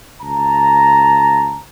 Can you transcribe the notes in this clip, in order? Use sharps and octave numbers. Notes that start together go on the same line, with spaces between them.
C#2 A5 A#5